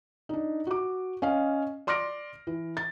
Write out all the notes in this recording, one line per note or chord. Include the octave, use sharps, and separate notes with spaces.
D4 D#4
F#4 D6
C#4 D#5 F5
D5 C6 D6 F6 A#6 D7
E3
A6